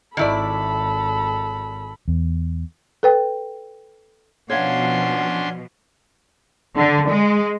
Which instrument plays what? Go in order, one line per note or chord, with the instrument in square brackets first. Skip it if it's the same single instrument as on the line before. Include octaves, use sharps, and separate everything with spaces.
[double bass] G#1 [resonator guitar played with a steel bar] D#3 E4 D5 [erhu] A4 [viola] B5
[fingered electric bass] E2
[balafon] A4 B4 G5
[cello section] B2 F3 [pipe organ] C#4 D4 C6 [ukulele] C#5 F5 [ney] F#5
[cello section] D3
G#3